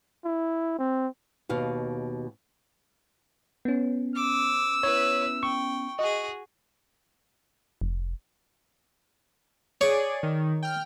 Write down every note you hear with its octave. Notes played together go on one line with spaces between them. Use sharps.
E4
C4
D#2 B2 F5
B3 C#4
D6 E6
E4 B4 C#5
G5 C#6
F#4 G#4 D#5
F1
G#4 C#5 D5
D#3
G5 F6